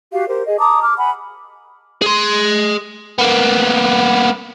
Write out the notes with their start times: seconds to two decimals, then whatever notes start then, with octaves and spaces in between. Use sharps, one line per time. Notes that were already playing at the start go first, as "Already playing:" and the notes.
0.12 F#4 G4 F5
0.28 G4 A#4 C5
0.46 G#4 D#5
0.58 A5 A#5 D6 D#6
0.82 D6 F6
0.97 F#5 G#5 B5
2.02 G#4 C6
3.19 A#3 B3